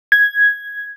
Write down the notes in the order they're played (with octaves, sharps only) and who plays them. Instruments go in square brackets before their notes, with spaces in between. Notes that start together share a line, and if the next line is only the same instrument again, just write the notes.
[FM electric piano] G#6